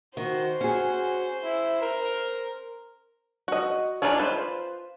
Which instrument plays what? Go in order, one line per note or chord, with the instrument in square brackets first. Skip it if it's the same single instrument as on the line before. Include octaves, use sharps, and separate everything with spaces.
[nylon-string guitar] D#3 [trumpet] F#4 [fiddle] C5
[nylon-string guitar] C#4 G#4 [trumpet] F#4
[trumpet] E4
A#4
[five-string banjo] F#4 D#5
D4 D#4 F4 G#4 C#5
F4 B4 C5